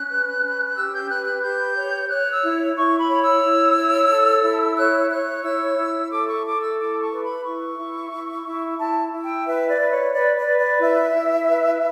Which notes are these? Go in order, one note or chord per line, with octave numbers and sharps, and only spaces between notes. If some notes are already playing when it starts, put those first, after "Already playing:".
Already playing: C#4 F#6
B4
C#4
G4 E6
G6
B4 F#6
F#6
G4 G6
C#5
C#5 F#6
E6
E4
E4 C#6
B5
C#5
E6
E4
C#5
A4
E4
C#5 F#6
C#5 F#6
E4 E6
E4
A4 D6
C#6
A4 D6
E6
E4 D6
C#6
B4
B5
E4 C#6
E4
E4
E4
E4 A5
E4
G5
B4 E5
D5
B4
C#5
B4 D5
D5
B4
D5
E4 E5
E4
B4